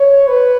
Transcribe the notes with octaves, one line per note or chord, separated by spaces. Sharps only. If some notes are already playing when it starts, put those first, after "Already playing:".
Already playing: C#5
B4